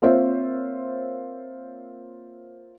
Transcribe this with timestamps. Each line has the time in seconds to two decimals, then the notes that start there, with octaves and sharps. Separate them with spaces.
0.02 A#3 C4 F4 C5 C#5 E5